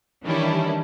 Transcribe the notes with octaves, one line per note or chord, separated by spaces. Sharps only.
D#3 E3 G3 C#4 D4 E4